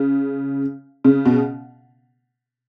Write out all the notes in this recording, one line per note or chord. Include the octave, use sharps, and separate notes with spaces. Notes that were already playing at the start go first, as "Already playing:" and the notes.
Already playing: C#3
C#3
B2